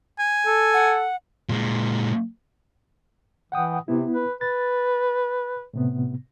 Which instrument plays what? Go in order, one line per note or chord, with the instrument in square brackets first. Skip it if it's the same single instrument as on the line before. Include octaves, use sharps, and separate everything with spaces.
[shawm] G#5
[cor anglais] A4
[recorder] F#5
[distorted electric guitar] A#2 G#3
[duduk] E3 [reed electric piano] F#5 G5 D#6
[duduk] C3 [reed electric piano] B3 E4
[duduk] B4
[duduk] B4 [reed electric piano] A6
[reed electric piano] A2 C3 B3